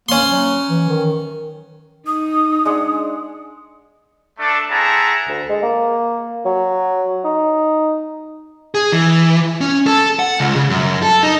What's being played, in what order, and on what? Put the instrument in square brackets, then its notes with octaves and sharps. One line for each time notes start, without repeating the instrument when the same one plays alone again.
[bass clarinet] A#3 [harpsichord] C#4 C6
[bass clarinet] F#3
E3
D#3
[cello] D#4 [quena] D#6
[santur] G#3 D4 F#5
[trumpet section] A3 D4 A4
C4 E4 G#4 F#5 A5 A#5
[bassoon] D2
G#3
A#3
F#3
D#4
[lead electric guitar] G#4
E3
C#4
A4
F#5
C#2
C#3
F#2
A4
D#4